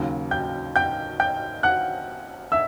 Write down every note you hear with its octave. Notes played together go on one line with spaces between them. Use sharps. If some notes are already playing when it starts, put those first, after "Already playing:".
Already playing: D#2 C#3 F#3
G5 G6
G5 G6
G5 G6
F#5 F#6
E5 E6